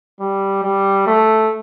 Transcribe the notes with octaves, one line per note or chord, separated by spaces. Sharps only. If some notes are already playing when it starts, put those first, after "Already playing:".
G3
G3
A3